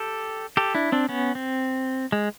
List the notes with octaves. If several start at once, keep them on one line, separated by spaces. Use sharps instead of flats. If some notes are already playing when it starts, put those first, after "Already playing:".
Already playing: G4 A4
G4 A4
D4 E4
C4 D4
B3 C#4
C4
G#3